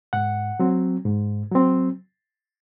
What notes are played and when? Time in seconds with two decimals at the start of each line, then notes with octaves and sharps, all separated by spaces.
0.13 G#2 F#5
0.60 F#3 C4
1.05 G#2
1.52 F#3 C4